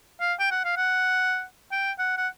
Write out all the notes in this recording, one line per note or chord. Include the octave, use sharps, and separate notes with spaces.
F5
G5
F#5
F5
F#5
G5
F#5
F#5